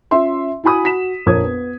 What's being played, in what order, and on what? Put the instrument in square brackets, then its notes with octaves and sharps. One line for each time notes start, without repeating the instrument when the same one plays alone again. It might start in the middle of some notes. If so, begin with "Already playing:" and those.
[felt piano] C#4 F4 E5 C6
E4 F#4 G#5 B5 D#6
F#4 B6 E7
A#1 F2 A#4 C#5 D#6 G#6
B3